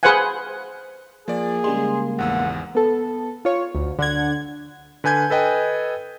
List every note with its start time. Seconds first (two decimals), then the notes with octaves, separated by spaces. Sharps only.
0.03 G#4 B4 C5 F5 F#5 G#5
1.28 F3 A#3 G#4 D5
1.64 C#3 G3 G#3 C6
2.19 G#1 E2 F#5 E6
2.75 B3 A4
3.45 F4 C#5
3.75 D2
3.99 D3 F#5 G#6
5.04 D3 B4 G#5 G6 G#6
5.30 A4 B4 D#5 G5 G#5